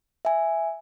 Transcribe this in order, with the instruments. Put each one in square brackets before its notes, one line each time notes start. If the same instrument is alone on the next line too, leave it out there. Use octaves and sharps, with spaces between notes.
[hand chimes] E5 G#5